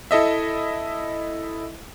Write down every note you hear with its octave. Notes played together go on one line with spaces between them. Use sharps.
E4 A4 D#5 E5